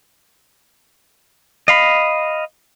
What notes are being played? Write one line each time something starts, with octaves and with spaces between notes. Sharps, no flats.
D#5 F5 B5